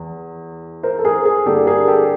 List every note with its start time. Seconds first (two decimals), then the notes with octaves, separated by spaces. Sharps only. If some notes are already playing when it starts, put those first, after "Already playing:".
Already playing: E2
0.83 A#4 C5
0.99 A4
1.05 G#4 A#4
1.25 G#4
1.46 G2 D3 G3 A#3 G4 A4
1.67 G#4 A#4
1.88 G4 A4